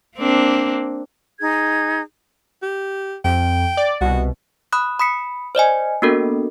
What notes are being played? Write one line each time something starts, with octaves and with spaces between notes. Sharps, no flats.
A#3 C4 D4
D#4 G#4 G#6
G4
F2 G5
D5
C2 B2 F#4
B5 D#6 F#6
B5 D#6 B6 C#7
C5 D5 D#5 G#5
A#3 B3 D4 F#4 A4 A#4